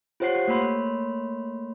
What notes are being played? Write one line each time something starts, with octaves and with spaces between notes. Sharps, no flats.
F4 G4 C5 C#5 F#5 C7
A3 A#3 C#5 B5 C6